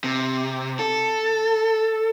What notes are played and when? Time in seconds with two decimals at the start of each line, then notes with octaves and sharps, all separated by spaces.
0.04 C3
0.79 A4